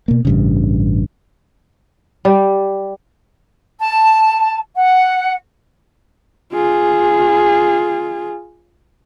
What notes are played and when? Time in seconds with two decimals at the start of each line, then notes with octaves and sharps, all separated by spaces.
0.08 B2 A#3
0.25 A1 G2 C#3
2.25 G3
3.80 A5
4.75 F#5
6.53 F4 G#4